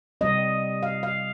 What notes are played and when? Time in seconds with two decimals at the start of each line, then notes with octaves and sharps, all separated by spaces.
0.21 C3 G3 C4 D#5
0.83 F5
1.03 F5